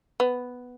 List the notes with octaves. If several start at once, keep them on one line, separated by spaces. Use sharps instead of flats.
B3